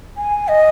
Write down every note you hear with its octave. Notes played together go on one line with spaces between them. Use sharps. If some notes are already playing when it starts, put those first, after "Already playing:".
G#5
D#5